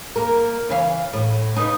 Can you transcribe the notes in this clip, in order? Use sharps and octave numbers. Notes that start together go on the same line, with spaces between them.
A#3 A#4
C#3 E3 F5
A2
C#3 B3 D#4